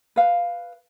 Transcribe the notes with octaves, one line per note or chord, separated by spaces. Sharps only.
B4 F5